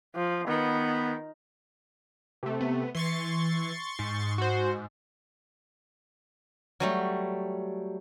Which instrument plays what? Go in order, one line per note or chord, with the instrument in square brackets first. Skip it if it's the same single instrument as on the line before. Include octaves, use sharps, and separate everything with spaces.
[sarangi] F3
[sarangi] D#3 [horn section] B3
[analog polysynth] C3 A3
[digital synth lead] B3
[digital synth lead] E3 [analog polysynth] C6 C#6 A6
[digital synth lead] G#2
[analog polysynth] F#4 C5
[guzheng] F#3 G3 A3